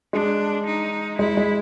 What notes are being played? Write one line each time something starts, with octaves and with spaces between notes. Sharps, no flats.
G#3 D4
D#4
G#3 E4
G#3